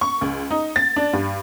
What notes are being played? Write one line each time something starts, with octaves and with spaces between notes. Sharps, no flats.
C#6
C#2
D#4
A6
D4
G2